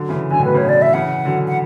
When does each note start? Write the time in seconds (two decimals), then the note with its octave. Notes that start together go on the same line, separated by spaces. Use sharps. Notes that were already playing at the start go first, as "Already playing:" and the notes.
Already playing: D3 F#3
0.09 C#3 E3
0.30 D3 F#3 G#5
0.39 A2
0.45 B2 B4
0.54 C#3
0.57 C#5
0.62 B2 D3
0.69 D5
0.82 E5
0.94 C#3 E3 F#5
1.25 D3 F#3
1.48 F#5